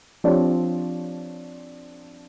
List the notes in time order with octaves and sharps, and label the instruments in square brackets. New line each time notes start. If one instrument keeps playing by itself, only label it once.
[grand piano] F3 C4 D4 G4 C#5 D5